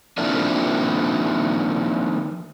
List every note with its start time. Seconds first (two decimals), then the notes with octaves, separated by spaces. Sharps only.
0.18 D#3 F3 A#3 C4 D4 E4